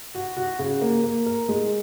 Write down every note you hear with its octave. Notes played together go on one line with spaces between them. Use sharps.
F#4
F#4
C#3
A#3
A#3
A#4
G#3